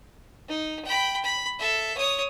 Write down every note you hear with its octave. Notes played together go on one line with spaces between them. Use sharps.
D#4
G5 B5
B5
A4 E5
C#5 D#6